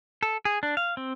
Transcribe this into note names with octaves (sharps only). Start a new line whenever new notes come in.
A4
G#4
D4
F5
C4